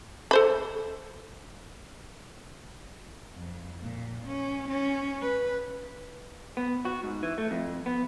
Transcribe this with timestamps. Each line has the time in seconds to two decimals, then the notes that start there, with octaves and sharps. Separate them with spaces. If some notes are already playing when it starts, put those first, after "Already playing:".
0.31 A4 C5 B5
3.35 F2
3.82 A#2
4.26 C#4
4.69 C#4
5.21 B4
6.57 B3
6.85 F#4
7.04 G#2
7.23 E3
7.38 A3
7.51 F2
7.86 B3